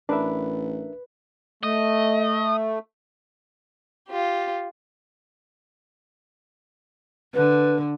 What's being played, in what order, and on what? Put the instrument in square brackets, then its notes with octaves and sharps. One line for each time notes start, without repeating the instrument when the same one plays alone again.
[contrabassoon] A1 [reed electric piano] D4 A#4 E5 [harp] B4
[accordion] A3 [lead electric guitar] D#5
[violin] F4 G4
[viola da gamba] D3 [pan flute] B4